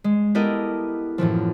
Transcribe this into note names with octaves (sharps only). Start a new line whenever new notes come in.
G#3
B3 E4 G4 A4 A#4 D#5
F#2 A2 E3 F3